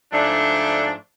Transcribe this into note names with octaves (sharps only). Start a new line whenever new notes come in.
G#2 F3 A3 D4